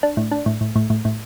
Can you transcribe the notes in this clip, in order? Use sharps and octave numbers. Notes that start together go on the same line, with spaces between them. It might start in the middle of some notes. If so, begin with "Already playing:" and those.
D4
A2
D4
A2
A2
A2
A2
A2